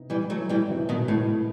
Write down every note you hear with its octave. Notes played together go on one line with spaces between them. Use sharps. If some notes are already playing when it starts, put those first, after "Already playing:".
Already playing: C3 B3 D#4
E3 G3
F#3 A3
E3 G3
C2 C3 F#3 B3 D#4
B2 D#3
A2